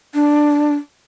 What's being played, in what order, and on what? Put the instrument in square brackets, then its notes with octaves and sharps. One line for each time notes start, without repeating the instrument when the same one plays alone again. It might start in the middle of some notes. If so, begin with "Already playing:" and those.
[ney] D4